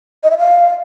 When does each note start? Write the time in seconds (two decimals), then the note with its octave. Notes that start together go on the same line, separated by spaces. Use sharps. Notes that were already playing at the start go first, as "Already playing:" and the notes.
0.23 D#5
0.31 E5
0.38 F5